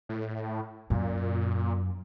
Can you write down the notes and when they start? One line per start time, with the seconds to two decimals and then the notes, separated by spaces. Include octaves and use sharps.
0.09 A2
0.90 F#2 A#2